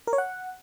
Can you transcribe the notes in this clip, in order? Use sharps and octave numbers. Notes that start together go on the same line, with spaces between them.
A#4
C#5
F#5